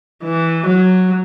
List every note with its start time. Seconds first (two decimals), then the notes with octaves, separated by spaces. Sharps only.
0.24 E3
0.66 F#3